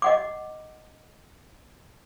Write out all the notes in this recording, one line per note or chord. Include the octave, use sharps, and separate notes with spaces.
D#5 F#5 D6